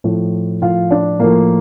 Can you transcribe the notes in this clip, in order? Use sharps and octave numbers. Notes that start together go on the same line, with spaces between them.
A2 F3
A2 F3 F4 F5
D4 D5
A2 F3 A#3 A#4